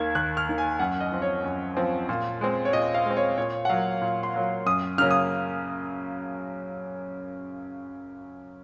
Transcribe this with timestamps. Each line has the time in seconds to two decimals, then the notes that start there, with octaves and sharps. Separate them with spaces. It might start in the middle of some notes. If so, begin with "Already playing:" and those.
Already playing: D#2 D#3 A#3 G#6
0.15 D#2 F#6
0.37 F6
0.48 D#3 A#3
0.58 G#5
0.79 F#2 F#5
1.00 D#5
1.12 F3 C4
1.22 C#5
1.44 F#2
1.77 F3 C4
2.09 A#2
2.41 G#3 C4
2.65 C#5
2.73 A#2 D#5
2.94 F5
3.06 G#3 C4
3.17 C#5
3.38 A#2 C#5
3.65 F#5
3.69 F#3 A#3 F5
4.01 A#2
4.23 C6
4.34 F#3 A#3
4.66 F#2 D#6
4.98 C#3 F#3 A#3 C#4 F6
5.11 D#6